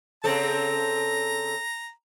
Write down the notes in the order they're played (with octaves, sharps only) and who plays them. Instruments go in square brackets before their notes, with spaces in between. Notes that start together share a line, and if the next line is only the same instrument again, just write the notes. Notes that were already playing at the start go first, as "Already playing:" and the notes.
[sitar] C#3 C4 A4 [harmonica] A#5